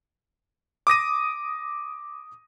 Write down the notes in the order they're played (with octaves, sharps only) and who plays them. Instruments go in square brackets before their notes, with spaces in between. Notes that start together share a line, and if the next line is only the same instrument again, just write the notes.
[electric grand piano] D6 D#6 A#6 D#7